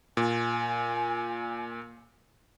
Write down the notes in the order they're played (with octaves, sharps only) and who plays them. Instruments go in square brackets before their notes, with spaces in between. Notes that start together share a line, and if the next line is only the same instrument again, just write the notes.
[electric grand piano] A#2 [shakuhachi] G#5